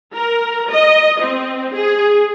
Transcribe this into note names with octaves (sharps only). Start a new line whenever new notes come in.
A#4
D#5
C4
G#4